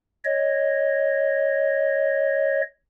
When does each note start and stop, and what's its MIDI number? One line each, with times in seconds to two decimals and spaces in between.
0.25 2.61 73
0.25 2.61 75